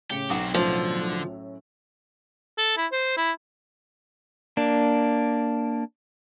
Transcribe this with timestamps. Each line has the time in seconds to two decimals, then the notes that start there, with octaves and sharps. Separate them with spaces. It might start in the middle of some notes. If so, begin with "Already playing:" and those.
0.10 A2 C#3 G4 C#7
0.30 B1 F#3 C4 F#5 D6
0.54 F#2 A2 D3 F3
2.58 A4
2.77 E4
2.92 C5
3.17 E4
4.57 A#3 D4